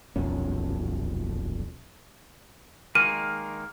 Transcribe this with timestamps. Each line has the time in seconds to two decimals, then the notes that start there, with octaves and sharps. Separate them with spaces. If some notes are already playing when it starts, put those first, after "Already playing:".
0.16 D#1 B1 F2 C#4
2.95 D#3 G#3 A#3 F6 D#7